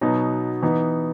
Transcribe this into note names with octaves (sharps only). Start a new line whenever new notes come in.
B2 F#3 B3 D#4
E3 B3 D#4